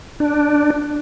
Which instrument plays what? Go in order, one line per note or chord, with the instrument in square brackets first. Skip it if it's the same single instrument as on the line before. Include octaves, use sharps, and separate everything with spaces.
[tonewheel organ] D4